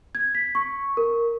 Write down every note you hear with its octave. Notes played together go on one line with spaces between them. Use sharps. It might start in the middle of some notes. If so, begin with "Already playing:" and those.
G#6
B6
C#6
A#4